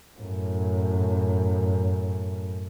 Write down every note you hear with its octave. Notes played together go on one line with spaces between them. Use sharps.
F#2 A2